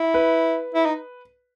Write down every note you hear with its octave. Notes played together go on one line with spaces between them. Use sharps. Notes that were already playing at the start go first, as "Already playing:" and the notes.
Already playing: E4
B4
E4
D#4